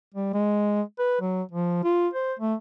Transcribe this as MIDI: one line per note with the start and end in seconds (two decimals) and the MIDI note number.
0.14 0.30 55
0.34 0.82 56
0.99 1.17 71
1.21 1.42 54
1.52 1.78 53
1.84 2.08 65
2.14 2.33 72
2.39 2.55 57